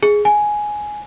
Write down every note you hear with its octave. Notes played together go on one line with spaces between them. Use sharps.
G#4
G#5